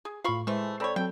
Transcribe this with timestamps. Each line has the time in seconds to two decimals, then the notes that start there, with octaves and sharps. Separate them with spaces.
0.05 G#4
0.24 A2 F4 F5 B5 C#6
0.47 E3 G#3 A3 C5 E5
0.80 C4 A4 C#5 D5 B5
0.96 F#3 C4 A4 G5